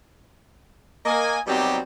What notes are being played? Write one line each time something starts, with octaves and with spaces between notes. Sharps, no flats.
A#3 D#5 G#5
B2 F#3 G3 C4 D#4 G4